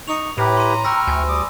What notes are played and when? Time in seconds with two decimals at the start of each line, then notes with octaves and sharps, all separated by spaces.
0.08 D#4 C#6 C#7 F7
0.38 A2 E4 G4 B4 A#5
0.57 C6 D#7
0.85 G5 B5 C#6 E6 F6 A#6
1.07 D2 G#5
1.28 G3 D6 D#6